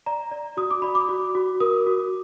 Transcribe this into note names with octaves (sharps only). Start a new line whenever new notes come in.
D5 A#5
D5
F#4 D#6
D6
D5 B5
D6
F#4
F#4
A#4 D#6
F#4